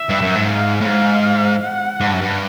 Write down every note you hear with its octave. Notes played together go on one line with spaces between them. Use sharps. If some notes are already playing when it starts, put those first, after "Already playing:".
Already playing: E5
G2
F#2
G#2
F5
A2
G#2 F5
F#5
G#2
G2
F#2
G2